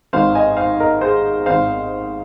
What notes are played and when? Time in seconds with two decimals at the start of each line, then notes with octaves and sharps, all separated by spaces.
0.13 G#1 G#2 D#3 C5 F5
0.35 D#5 G#5
0.57 C5 F5
0.80 A#4 D#5
1.01 G#4 C5
1.46 G#1 G#2 D#3 C5 F5